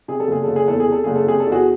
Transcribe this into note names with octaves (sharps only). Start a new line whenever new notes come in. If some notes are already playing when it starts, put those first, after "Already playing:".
C3 G#4
A4
F#1 G#4
F#1 A4
G#4
E2 A4
G#4
C3
A4
F#1 G#4
A4
C3 G#4
A4
E2
F#4 G#4